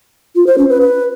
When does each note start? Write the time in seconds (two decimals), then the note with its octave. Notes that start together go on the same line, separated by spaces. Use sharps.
0.35 F4
0.47 C5
0.58 C#4
0.69 B4
0.81 B4